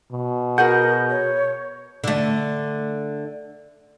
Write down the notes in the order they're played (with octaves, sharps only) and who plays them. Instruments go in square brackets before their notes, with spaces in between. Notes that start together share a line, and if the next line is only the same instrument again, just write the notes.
[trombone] B2
[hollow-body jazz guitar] F#4 G#4 F#5 [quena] A#4 [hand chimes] G6
[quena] C#5
[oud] D3 A3